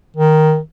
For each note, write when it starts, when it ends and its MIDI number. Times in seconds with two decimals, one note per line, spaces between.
0.17 0.59 51